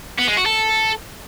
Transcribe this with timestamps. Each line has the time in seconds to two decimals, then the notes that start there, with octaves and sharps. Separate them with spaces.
0.19 B3
0.28 G#3
0.37 F#4
0.46 A4